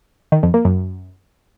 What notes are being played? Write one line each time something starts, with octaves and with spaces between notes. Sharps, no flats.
D#3
F2
A#3
F#2